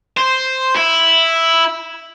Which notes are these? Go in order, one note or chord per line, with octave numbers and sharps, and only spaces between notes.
C5
E4